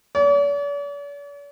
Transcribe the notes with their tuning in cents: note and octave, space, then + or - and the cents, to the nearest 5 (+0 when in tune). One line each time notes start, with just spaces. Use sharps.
D5 -45